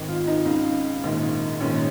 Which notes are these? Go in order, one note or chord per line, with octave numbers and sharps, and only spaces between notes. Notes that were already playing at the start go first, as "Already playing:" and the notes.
Already playing: G#1 G#2 D#3
F4
D#4
C#2 C#3 D#4
A#1 G#2 D#3
A#1 G#2 D#3 C#4